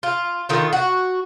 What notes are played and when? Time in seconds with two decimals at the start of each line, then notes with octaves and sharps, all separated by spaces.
0.03 F4
0.49 D3 D#3 F4
0.73 F#4